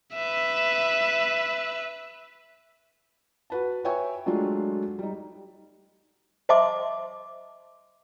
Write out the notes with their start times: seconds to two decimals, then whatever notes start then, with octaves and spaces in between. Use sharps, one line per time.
0.14 B4 E5
3.50 F#4 B4 A5
3.84 B4 C#5 E5 G5 G#5 C#6
4.26 F#3 G#3 A3 D4 F4
4.99 G3 D#4
6.49 C5 D#5 E5 A5 C6 D6